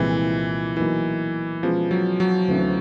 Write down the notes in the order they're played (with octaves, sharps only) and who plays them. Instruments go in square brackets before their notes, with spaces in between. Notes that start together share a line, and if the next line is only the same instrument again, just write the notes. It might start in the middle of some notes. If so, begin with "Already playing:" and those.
Already playing: [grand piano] C2 A#2 F3 G#3 C4 [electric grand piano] E3
[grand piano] B2 F#3 A#3 D#4 [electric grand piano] E3
[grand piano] B2 G#3 C#4 F4 G#4 [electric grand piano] F3
[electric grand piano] F#3
F#3
[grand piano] D2 C3 E3 A3 C#4